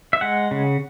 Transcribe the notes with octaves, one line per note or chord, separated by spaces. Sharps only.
E5
G#3 F#5
C#3